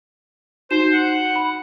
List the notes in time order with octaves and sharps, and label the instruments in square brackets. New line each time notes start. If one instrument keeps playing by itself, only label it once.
[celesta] D#4 F#4 E7 [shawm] C5
[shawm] F#5
[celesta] B5